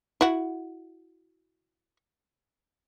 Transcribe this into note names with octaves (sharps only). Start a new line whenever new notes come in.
E4 F#4